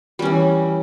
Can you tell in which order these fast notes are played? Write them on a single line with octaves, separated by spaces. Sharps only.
G3 C#4 E3